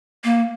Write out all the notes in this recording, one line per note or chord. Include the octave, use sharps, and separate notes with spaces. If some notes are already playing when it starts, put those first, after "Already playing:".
A#3